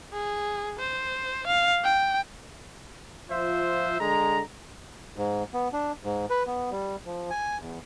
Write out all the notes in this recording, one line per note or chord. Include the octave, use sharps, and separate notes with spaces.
G#4
C5
F5
G5
F3 F4 C5 E5
D3 G#3 A#5
G#2
B3
D4
G#2
B4
B3
G3
F3
G#5
E2